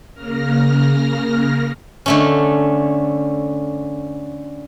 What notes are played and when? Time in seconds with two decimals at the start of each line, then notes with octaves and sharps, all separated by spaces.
0.15 C#3 A#3 F6 A#6
2.06 D3 A3 C#4